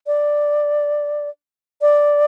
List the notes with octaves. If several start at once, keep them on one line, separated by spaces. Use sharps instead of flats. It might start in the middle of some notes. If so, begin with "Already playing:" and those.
D5
D5